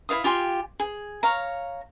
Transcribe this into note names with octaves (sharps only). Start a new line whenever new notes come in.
E4 C#5 F5 D#6
F4 G4 G#5 C6
G#4
C#5 F5 A#5